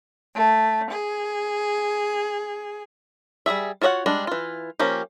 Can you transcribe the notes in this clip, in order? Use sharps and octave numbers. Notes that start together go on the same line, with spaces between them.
A3
G#4
G3 F#4 G#4 E5
F4 F#4 C#5 D#5 F#5
G3 G#3 D4
E3 F4
F3 A#3 C#4 G4